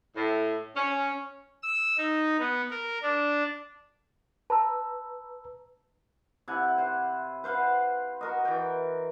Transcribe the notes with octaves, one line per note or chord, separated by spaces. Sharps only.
A2
C#4
E6
D#4
B3
A#4
D4
B4 A5 A#5 E6
C3 E4 F#5 G#5
C5 F#5
B4 C5 F5 F#5
F#4 A#4 D#5
E3 G5